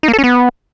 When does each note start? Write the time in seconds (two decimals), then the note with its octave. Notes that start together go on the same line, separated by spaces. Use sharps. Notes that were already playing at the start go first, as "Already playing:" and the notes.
0.03 D#4
0.08 A#3
0.13 A4
0.19 C#4
0.24 B3